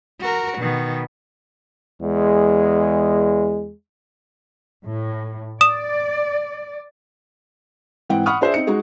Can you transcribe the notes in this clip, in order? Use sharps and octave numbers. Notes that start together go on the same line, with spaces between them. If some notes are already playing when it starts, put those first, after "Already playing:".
F#4 A#4
B2 D#3
E2 G#3
A2
D5 D#6 E7
G#2 E3 C4 F#5 G5
F#5 B5 C#6 D#6 F6
D4 G#4 C5 D5 E5
C4 D#4 C#7
G#3 D#4 F#4 G#4